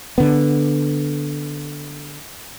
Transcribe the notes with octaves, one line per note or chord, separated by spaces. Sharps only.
D3 B3